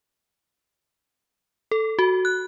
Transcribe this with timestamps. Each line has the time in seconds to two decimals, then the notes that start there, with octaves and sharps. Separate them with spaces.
1.71 A4
1.99 F#4
2.25 F#6